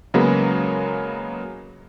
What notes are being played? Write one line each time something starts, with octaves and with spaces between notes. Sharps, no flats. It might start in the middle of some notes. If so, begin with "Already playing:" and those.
C#3 F#3 G#3 A#3 B3